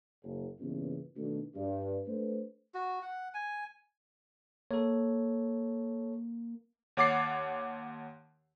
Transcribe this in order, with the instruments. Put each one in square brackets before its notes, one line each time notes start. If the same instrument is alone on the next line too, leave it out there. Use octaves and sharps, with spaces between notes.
[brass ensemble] F#1
G2 A#2 C#3 E3 B3 C#4
B2 D#3 A3 D4
G2
A3 D4 B4 C5
[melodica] F#4
F#5
G#5
[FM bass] A#3 [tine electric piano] A4 C#5
[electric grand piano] D#2 C#5 F#5 D6 A6 C7